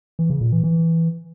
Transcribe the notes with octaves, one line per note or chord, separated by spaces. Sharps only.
E3
C#3
A#2
E3
E3